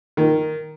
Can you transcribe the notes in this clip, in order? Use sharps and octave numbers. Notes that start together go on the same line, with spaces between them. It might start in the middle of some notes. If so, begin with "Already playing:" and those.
D#3